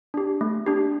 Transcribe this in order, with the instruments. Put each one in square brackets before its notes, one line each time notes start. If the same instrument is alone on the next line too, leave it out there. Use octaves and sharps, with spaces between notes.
[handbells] D4 G4
A3
D4 G4